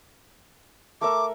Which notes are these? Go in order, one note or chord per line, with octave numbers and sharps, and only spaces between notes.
A3 A#4 E5 D6